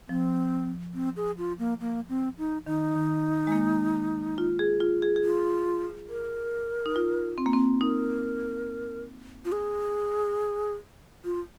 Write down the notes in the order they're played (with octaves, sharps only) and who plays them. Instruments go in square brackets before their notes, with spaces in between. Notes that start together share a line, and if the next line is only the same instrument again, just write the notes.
[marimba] F3 [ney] C4
[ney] C4
G#4
F4
A#3
A#3
C4
D#4
[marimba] D#3 [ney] D#4
[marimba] D#3
G#3
A#3
F4
G#4
F4
G#4
G#4
[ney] F4
A#4
[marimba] D#4
F4
C4
A#3
C4
[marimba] D#4 [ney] A#4
[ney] F4
G#4
F4